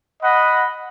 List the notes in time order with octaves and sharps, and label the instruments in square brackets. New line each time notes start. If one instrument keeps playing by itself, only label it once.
[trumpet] D#5 [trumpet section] F#5 B5